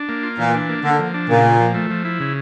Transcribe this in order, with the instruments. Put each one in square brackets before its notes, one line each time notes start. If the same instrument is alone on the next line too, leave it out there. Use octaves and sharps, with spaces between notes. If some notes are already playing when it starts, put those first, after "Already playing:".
Already playing: [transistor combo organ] D4
A#3
F4
[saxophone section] A#2 [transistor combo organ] E3
[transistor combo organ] D4
A#3
[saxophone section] D3 [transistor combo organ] A#3
[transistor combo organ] F3
D4
[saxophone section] A#2 [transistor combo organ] C#3
[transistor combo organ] A#3
F3
A3
F3
E4
C#3